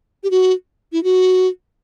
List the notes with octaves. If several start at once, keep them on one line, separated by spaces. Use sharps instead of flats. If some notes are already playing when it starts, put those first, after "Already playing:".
G4
F#4
E4
F#4